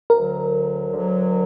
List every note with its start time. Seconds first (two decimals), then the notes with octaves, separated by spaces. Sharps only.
0.10 D2 D3 F#3 A#4
0.93 D2 D3 F#3